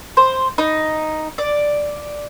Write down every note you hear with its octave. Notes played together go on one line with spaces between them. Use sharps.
C5
D#4
D5